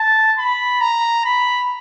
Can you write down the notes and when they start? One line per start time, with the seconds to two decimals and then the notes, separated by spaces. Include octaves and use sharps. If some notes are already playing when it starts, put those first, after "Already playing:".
Already playing: A5
0.38 B5
0.81 A#5
1.25 B5